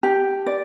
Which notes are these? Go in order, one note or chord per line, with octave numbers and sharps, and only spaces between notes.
G4
D5